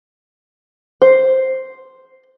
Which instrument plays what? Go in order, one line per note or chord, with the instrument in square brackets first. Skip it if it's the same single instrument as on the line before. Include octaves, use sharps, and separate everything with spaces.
[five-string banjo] C5